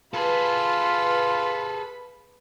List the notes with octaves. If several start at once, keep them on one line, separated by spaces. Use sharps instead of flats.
F4 G#4 A4 B4 B5